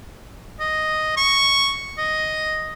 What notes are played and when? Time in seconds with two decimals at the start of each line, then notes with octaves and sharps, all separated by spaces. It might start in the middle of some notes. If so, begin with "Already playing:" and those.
0.60 D#5
1.17 C#6
1.98 D#5